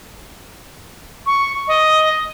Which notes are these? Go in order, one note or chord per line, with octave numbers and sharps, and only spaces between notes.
C#6
D#5